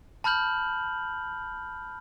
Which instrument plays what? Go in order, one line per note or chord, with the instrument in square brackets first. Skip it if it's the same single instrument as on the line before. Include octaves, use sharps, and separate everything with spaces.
[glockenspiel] A5 B5 F6 G6 F#7